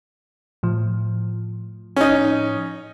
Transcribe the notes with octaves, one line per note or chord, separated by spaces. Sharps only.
A2 F3
C#4 D#4